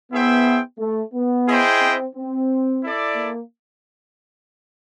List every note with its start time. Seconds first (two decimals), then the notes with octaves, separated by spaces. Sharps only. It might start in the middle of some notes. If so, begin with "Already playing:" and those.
0.12 B3 E4 G#4 C5 E5 G5
0.79 A3
1.14 B3
1.48 E4 G#4 C5 D#5 G5
1.82 C4
2.16 C4
2.83 E4 A4 D5
3.16 A#3